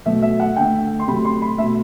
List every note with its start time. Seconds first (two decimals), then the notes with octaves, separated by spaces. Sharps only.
0.06 B2 F#3 A3 E5
0.22 E5
0.40 F#5
0.56 D3 A3 G5
1.00 C6
1.08 C3 F#3 A3 B5
1.25 C6
1.42 B5
1.58 B2 A3 E5